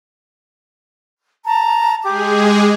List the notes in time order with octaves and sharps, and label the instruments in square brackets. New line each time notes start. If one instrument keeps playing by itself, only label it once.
[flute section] A5 A#5
[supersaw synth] G#3 G#4 [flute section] G4 D6